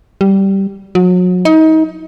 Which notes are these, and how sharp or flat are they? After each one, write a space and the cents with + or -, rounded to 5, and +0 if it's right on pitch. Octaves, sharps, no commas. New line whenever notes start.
G3 -10
F#3 -35
D#4 +30